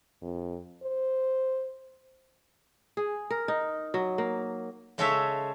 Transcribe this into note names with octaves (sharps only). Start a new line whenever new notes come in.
F2
C5
G#4
A#4
D#4
F#3
A#3
C#3 G#3 C#4 A4 C#5 E5